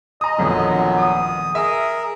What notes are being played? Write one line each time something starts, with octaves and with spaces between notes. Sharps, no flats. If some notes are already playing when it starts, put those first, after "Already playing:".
D#5 A#5 D#6
D#1 F2 A#2 D3 F#3 B3
D#6
G#4 A#4 E5